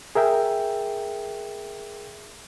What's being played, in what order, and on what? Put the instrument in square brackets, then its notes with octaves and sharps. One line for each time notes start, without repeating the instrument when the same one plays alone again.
[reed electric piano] G#4 A#4 E5 G5